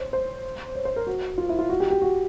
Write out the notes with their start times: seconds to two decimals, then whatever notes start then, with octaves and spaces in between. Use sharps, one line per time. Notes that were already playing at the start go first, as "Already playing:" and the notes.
Already playing: C5 C#5
0.13 C5
0.75 C#5
0.85 C5
0.96 A#4
1.07 F#4
1.38 F4
1.49 E4
1.59 F4
1.70 F#4
1.80 G4
1.91 G4
2.02 F#4